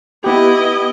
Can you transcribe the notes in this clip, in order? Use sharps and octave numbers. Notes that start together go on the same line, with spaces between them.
B3 E4 G4 D#5